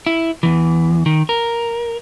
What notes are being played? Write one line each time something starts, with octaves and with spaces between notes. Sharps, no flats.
E4
E2 E3
D#3
A#4